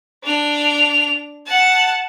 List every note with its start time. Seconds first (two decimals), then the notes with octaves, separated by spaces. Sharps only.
0.23 D4 F7
1.46 F#5 A5